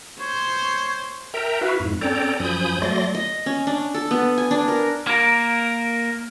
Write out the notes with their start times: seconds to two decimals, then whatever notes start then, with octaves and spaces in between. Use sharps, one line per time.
0.20 C5 C#5
1.34 A#4 E5 G5 A#5
1.61 E4 F#4 B4 E5 F5
1.80 F2 G#2
2.01 C4 C#4 A4 D5 G5 A#5
2.40 F#2 F3 G#5 B5 D#6 G6
2.82 F#3 A3 D5 C6 A#6
3.15 D#5
3.46 C#4
3.67 D4
3.94 A4
4.11 B3
4.38 G#5
4.51 D4
4.68 A#4
5.07 A#3 A#4